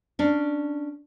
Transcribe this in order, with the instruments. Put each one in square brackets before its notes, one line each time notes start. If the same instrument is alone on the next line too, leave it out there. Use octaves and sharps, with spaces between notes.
[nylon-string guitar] C#4 D4